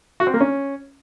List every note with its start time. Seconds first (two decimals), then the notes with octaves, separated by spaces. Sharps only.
0.20 F#4
0.27 C4
0.34 A#3
0.40 C#4